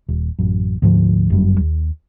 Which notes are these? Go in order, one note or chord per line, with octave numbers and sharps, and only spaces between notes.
D#1
A1 F#2
D2 G#2 F3
G1 F#2 G3
D#2